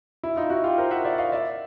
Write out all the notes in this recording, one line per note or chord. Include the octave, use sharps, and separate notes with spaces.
E4
D#4 F4
E4 F#4
F4 G4
A#4 C5
E5 F#5
D5 E5
D#5 F5
D5 E5